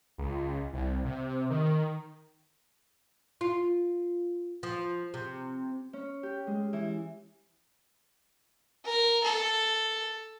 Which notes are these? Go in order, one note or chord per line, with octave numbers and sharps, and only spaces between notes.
C#2
C2
C3
D#3
F4
F3
C3
C#4
G4
G#3
E3
A#4
A4